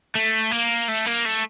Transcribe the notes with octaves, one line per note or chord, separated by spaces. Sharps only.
A3
A#3
A3
A#3
A3